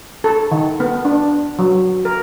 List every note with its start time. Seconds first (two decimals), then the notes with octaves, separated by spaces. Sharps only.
0.24 A4
0.51 D#3
0.80 B3
1.05 D4
1.59 F#3
2.05 A#4